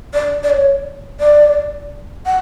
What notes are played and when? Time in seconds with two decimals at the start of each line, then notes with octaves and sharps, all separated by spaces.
0.14 D5
0.43 D5
0.50 C#5
1.20 D5
2.26 F#5